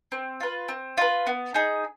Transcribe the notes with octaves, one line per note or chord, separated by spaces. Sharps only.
C4
F4 B4
C4
F4 B4
B3
D#4 G#4